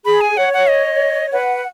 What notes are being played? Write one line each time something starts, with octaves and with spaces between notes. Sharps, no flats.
G#4 B5
G#5
C#5 F#5
F#5
D#5
B4 F#5